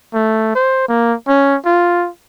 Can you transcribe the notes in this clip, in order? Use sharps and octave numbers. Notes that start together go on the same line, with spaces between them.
A3
C5
A#3
C#4
F4